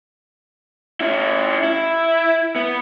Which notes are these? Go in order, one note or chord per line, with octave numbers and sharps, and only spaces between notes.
C#4 E4
E4
B3